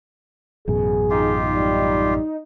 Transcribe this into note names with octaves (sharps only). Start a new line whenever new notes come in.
A1 F#2 B2 G#4
D#4 F4 G4
G3